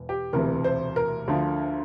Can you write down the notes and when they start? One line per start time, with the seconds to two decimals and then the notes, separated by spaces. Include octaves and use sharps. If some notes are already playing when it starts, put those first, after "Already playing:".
Already playing: E1 E2
0.09 G4
0.33 E1 D2 C3 E3 A#4
0.64 C5
0.96 A#4
1.28 D2 D3 F3